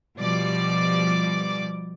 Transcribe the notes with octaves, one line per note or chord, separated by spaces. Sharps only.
B2 F3 G3 D5 D6